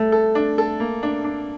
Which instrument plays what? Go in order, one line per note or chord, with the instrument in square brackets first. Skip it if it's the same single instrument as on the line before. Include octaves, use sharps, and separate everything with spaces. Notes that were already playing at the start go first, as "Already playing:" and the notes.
Already playing: [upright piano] G3 A4 [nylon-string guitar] A3
[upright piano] A4
D4
A4
A#3
D4
D4